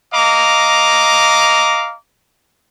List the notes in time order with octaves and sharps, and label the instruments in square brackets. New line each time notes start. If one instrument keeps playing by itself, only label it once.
[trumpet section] D#5 F5 A#5 D6